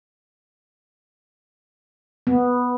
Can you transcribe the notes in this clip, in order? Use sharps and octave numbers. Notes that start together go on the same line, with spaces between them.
B3